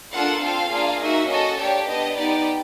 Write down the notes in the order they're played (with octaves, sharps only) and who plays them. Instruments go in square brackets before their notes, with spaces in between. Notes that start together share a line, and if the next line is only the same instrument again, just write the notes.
[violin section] A#3 D4 F4 A4 F#5
C4 F4 A4 F5
A#3 D4 F4 G#4
A#3 D#4 F#4 E5
C#4 F#4 A4 D#5
A#3 D4 G4 C#5
B3 D4 G4 D#5
B3 D#4 G4 D5